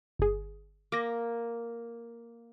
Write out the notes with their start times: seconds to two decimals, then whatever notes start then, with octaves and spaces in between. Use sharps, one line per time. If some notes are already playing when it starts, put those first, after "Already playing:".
0.19 G1 G#4
0.92 A#3 D6 A#6